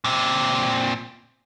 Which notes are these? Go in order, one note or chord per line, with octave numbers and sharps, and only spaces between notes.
A#2 C4